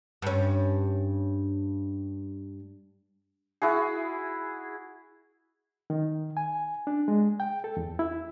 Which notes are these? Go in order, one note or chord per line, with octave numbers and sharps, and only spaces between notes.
G2 C#4
E4 F#4 G#4
D#3
G#5
D4
G#3
G5
A4
E2
E4